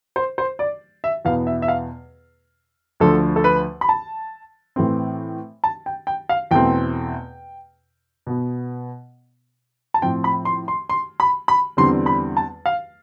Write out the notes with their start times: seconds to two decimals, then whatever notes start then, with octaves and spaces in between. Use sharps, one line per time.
0.16 C5
0.38 C5
0.59 D5
1.04 E5
1.25 E2 B2 B3 F5
1.47 E5
1.62 E5
1.68 F5
3.00 D2 D3 F3 A4
3.36 A4
3.44 B4
3.81 B5
3.89 A5
4.76 A2 E3 A3 C4
5.64 A5
5.86 G5
6.07 G5
6.29 F5
6.51 E2 B2 A3 C4 G5
8.27 B2 B3
9.94 A5
10.02 A2 F3 C4 G5
10.24 B5
10.45 C6
10.68 C6
10.89 C6
11.20 B5
11.48 B5
11.77 E2 D3 G3 C4 C6
12.06 B5
12.37 A5
12.66 F5